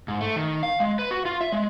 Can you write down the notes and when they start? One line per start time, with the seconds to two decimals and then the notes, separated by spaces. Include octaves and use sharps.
0.08 G#2
0.21 A3
0.36 D#3
0.63 F5
0.80 G#3
0.99 B4
1.11 F#4
1.25 F4
1.41 E5
1.52 G#3